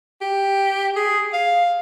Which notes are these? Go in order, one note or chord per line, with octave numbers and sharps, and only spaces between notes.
G4
G#4
F5